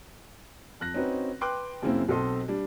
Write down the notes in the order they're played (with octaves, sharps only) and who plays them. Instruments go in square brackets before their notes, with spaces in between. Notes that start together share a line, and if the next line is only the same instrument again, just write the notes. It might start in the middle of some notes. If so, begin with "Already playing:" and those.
[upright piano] F2 F#6 A#6
C4 C#4 D#4 F#4 B4
B4 G5 C6 D6 F#6
F#2 C#3 A#3 C4 E4
B1 C4 A4 D#5 C6
G3 D4